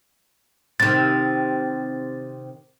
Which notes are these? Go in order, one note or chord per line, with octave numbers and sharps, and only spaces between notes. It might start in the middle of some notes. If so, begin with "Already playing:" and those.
C3 D#3 A6